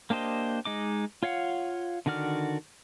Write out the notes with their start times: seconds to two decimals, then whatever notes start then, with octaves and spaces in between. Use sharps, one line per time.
0.10 A#3 D4 G4 C5 D#5
0.65 G#3 D#4 D6
1.23 F4 C#5 F5 F#5
2.06 D3 D#3 F#4 D5 F6